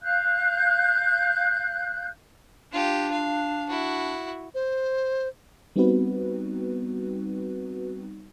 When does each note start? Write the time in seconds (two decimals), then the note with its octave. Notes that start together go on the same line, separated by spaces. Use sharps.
0.01 F5 F#6 G6
2.72 D4 F4 G4
3.12 F5
3.69 E4 F#4
4.55 C5
5.76 G3 B3 C4 D#4 F#4 B4